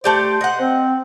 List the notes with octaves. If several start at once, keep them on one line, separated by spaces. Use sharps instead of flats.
A3 G4 C5 D5
D#5 F#5
C4